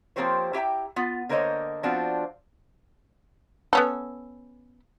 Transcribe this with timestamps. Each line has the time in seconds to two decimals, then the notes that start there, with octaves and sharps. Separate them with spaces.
0.16 F3 A#3 C4 G4 C5 C#5
0.53 E4 G4 E5 G5 A#5
0.96 B3 F4
1.29 D3 A#3 A#4 C5 C#5 D#5
1.83 F3 B3 C4 D4 F4 F#4
3.73 B3 C#4 A4